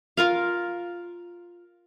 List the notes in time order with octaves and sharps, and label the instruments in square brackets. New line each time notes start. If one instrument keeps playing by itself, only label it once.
[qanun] F4 A#4 F5